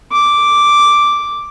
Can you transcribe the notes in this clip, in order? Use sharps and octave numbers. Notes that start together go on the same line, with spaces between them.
D6